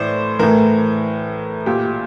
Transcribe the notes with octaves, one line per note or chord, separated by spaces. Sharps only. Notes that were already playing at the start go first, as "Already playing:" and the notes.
Already playing: A2 E3 C5 D5
A2 E3 A#4
A#2 G4